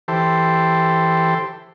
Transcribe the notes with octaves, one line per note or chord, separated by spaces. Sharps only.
E3 G4 A4 C5